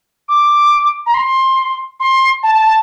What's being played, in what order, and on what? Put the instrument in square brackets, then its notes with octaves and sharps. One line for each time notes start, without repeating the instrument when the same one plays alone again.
[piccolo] D6
A#5
C6
C6
A5
A5
A5